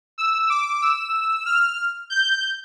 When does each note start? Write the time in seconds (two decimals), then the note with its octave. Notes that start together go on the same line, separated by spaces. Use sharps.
0.18 E6
0.49 D6
0.82 E6
1.46 F6
2.10 G6